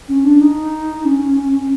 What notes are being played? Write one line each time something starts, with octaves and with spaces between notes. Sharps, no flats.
C#4
D4
D#4
C#4